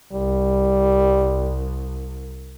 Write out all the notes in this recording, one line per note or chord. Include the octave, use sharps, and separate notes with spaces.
C2 G3